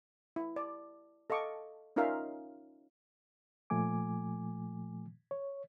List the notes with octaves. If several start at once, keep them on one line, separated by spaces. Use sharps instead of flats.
E4
D5
A4 D#5 F5 C#6 D6
C#4 D#4 F4 A#4 E5 F5
A#2 F3 A3 G#5 D6
C#5